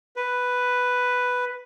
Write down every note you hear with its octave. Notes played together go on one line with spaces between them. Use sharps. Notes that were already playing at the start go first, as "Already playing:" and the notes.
B4